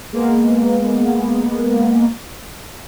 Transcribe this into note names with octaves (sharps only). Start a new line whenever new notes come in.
G#3 A#3 B3